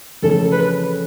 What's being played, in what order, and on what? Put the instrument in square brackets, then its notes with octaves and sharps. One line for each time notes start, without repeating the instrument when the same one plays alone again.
[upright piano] F2 C#3 E3 A3 C#4 [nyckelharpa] A4
[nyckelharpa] B4